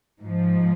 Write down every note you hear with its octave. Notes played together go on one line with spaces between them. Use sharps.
G#2 F3